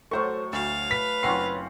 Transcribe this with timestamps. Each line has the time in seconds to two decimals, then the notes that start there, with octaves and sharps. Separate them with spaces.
0.11 A2 F#3 A3 C5 C#6
0.53 D2 F5 A5
0.91 B4 B6
1.23 F#1 C4 C#4 F4 F#5 C7